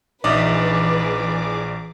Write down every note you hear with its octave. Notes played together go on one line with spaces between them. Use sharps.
A#1 E3 D#4 G#4 B4 D5 E5 D6